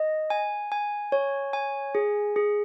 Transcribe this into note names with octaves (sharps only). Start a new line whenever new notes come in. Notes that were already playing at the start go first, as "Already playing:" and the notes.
Already playing: D#5
G#5
G#5
C#5
G#5
G#4
G#4